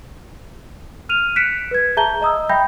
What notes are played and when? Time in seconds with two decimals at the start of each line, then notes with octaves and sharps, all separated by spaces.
1.09 F6 D#7 F7
1.36 F#6 B6 C#7 D7 E7
1.71 B4 G#6
1.97 G#4 E5 A5 A#5 G6 G7
2.21 D#5 A#5 D#6 E6
2.49 E5 G5 B5 G6 A#6